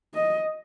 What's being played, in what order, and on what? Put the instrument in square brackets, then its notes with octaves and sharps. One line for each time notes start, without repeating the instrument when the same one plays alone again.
[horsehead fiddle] D#5